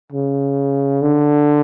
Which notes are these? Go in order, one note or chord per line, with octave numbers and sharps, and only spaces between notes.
C#3
D3